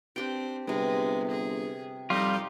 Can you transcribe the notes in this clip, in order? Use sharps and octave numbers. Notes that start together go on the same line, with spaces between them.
C4 D4 G4 G5
G1 C3 G#3 B3
G#4
F2 G3 D#4 F4 G4